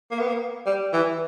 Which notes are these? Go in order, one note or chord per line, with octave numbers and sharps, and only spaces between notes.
A#3
B3
A#3
G3
E3